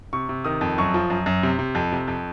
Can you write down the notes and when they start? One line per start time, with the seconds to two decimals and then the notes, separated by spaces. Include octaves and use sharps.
0.13 C3 C#6
0.29 C3
0.45 D#3 D#6
0.61 F2
0.78 F#2 C#6
0.94 F3
1.10 F#2
1.26 F#2
1.43 C3
1.59 C3
1.75 F2
1.92 C3
2.08 F2